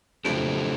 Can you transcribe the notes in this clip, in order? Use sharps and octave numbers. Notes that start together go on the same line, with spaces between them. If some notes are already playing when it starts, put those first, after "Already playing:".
F2 C#3 F#3 A3 D4 G4